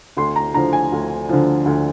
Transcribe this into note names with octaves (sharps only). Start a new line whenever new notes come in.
D2 C6
A#5
D3 F3 A#5
G#5
D2
D3 F3
D2